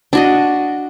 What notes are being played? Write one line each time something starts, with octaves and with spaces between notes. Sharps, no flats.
D4 F#4 D#5